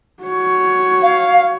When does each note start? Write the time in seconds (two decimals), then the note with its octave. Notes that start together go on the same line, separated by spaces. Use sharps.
0.23 F#4 C#5
1.02 F5